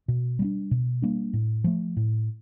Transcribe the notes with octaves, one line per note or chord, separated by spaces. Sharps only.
B2
G3 A#3
D4
B2
G3 A#3 D4
A2
F3 A3
A2